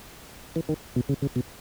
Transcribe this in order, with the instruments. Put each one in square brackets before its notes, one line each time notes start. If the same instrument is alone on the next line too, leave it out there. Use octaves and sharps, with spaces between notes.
[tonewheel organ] E3
D#3
B2
C#3
C#3
B2